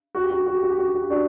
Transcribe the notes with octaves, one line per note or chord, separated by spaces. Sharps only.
F#4
G4
F#4
G4
F#4
G4
F#4
G4
F#4
G4
F#4
G4
D4 F#4